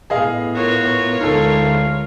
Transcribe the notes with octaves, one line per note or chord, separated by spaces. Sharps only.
A2 B3 G#4 D#5 F5
F4 F#4 A#4 C#5
D2 G#3 D#4 A4 F5